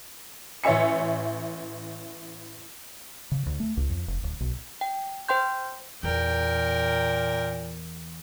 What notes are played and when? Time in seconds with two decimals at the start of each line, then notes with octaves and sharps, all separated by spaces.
0.64 A1 C#5 E5 G#5 C#7
3.32 C#3
3.46 D2
3.60 A3
3.77 C#2
3.90 F2
4.08 F1
4.23 D1
4.40 B1
4.81 G5
5.29 C5 G5 C6 G6
6.03 E2 A#2 A#4 G5